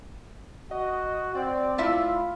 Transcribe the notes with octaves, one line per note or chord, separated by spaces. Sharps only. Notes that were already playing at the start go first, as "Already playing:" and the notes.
F#4 D#5
C4 D5
A3 E4 F4 E5